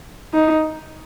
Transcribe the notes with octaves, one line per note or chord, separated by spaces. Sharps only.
D#4